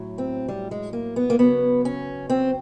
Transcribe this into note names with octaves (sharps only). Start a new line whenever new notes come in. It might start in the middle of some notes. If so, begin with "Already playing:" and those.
Already playing: A2 F#3
C4
G3
G#3
A#3
B3
A#3
C#3 F#3 B3
C#4
C4